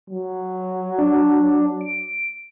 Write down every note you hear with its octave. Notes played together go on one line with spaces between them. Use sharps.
F#3
D4
D7